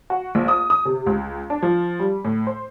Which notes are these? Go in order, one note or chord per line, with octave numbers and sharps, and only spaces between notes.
F#4
A#1
D#6
D#6
C3
C#2
D4
F3
G3
A2
C5